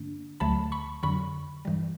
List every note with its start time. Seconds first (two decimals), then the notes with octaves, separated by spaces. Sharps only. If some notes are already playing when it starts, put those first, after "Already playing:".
Already playing: G2 D3 A#3 D4
0.40 D2 D3 F#3 A3 A5 B5
0.72 B5 C#6
1.03 F2 D3 F#3 B5 C#6
1.65 G2 E3 G3